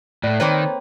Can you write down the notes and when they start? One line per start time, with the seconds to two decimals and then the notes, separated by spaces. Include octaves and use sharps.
0.23 A2 A3 D5 F#6
0.40 D#3 A#3 C4 B4 C#5